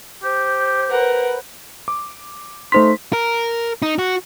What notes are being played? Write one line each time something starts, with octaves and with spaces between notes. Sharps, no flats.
G4 C5
A#4 B4 F#5
D6
A3 D#4 C5 C6 B6
A#4
D#4
F#4